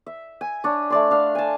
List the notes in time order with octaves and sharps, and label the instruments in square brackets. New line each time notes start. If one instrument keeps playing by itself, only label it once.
[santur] E5
G#5
D4 C#5
A3 D5 C6
D4 F5
G#5 A5